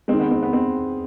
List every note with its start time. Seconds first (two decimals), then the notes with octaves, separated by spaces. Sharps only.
0.08 G#3 C4
0.13 D#3
0.20 B3
0.31 C4
0.43 B3
0.53 C4